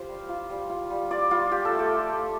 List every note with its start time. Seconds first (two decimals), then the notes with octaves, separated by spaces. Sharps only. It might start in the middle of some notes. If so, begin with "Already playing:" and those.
Already playing: F4 G4 C5 F5
0.08 G3
0.29 F4
0.50 G3
0.70 F4
0.90 G3
1.10 F4 D5
1.31 G3 F4
1.51 F4 G4
1.65 A4
1.72 A3
1.79 G4
1.92 F4
2.12 A3